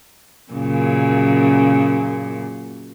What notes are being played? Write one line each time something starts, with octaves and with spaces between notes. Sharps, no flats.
F#2 A#2 C#3